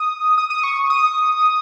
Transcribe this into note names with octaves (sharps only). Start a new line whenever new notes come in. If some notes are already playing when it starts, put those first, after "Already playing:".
Already playing: D#6
D#6
D#6
C#6
D#6